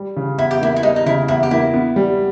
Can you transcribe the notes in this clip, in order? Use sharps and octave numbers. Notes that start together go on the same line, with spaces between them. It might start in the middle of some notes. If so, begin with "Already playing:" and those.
Already playing: G3
C#3
E2 E4
G4
A#3 E4
E4
G3 D#4
D#4
C#3 E4
E2 E4
G4
A#3 E4
B3
G3